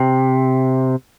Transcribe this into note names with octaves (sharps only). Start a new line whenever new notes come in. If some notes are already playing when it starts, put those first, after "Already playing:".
Already playing: C3